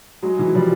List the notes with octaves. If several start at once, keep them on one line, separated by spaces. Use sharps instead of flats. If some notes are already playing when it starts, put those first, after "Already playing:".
F#3 G#3
E3 F#3
F3 G3